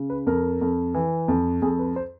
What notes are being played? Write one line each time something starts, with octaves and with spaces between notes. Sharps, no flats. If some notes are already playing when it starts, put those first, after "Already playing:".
Already playing: C#3
B4
F2 A#4
F2
E3
F2
F2 G#4
B4
C5